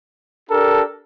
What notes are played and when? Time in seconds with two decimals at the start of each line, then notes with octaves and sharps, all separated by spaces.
0.50 D4 G4 A4 A#4